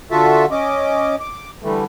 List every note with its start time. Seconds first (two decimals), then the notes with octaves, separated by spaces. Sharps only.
0.11 D3 F4 F#4 A4 E5 A5
0.51 C#4 D#5 D6
1.20 D6
1.63 D3 E3 G3 A3